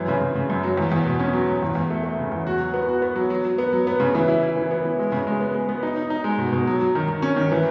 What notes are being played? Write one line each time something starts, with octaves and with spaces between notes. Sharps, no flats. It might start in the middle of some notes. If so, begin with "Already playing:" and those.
Already playing: F#2 E3
C#3
C#3
C#3
F#2
F#3
E2
E2
B2
C#4
F#3
F#3
E2
E2
A3
A3
C#3
E2
F#4
F#3
B3
F#4
B3
F#3
F#3
F#3
B3
F#3
B3
C#3
E3
E4
E4
E3
B3
E3
G#3
C#3
G#3
B3
G#3
B3
D#4
D#4
D#4
G#3
B2
B2
F#3
F#3
D#3
D#3
C#4
D#3
E3